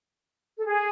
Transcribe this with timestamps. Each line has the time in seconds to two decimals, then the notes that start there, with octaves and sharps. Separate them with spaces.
0.56 A4
0.65 G#4